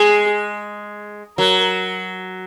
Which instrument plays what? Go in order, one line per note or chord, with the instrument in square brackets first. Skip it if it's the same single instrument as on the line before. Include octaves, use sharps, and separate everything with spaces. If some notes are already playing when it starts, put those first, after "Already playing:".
Already playing: [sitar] G#3 [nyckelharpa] G#4
[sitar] F#3 [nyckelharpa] A#4